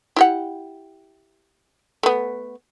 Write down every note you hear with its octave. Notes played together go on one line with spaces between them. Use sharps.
E4 G4 F#5
A3 B3